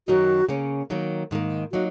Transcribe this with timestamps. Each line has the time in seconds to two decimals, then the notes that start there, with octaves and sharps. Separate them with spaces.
0.08 F#2 D#3 F#3 D#4 F#4 A#4
0.49 C#3 A#3 C#4
0.90 D#3 F#3 A#3
1.31 G#2 D#3 A#3
1.72 F#3 A#3 D#4 F#4